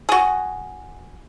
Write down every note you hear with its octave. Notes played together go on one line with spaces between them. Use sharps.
F#4 G#4